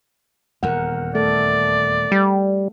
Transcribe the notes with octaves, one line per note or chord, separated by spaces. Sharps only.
D#1 E2 A#4 F#5
A3 A4 D5
G3